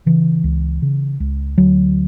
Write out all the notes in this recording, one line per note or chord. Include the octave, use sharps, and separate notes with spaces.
C#3 E3
C#2
C#3
C#2
D2 F#3